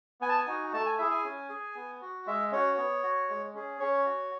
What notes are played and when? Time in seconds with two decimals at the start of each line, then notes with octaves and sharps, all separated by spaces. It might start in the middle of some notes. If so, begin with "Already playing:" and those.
0.21 B3 G#5
0.29 A5
0.38 G#5
0.47 D#4 F#4
0.73 A3 A5
0.86 G#5
0.98 E4 G#4 E5
1.11 G#5
1.24 C#4
1.49 G#4
1.76 B3
2.01 F#4
2.27 G#3 E5
2.52 C#4 F#4 C#5
2.77 B3
3.03 F#4
3.29 G#3
3.54 C#4 G#4
3.80 C#4 C#5
4.06 F#4